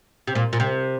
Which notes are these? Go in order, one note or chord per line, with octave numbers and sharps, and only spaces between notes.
C3
A#2
A#2
C3